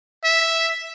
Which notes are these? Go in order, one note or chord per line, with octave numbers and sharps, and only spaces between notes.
E5